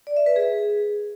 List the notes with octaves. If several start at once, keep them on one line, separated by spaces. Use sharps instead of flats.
D5
E5
B4
G#4